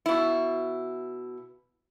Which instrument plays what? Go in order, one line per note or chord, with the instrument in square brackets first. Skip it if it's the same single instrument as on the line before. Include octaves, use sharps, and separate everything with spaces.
[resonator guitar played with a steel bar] B2 E4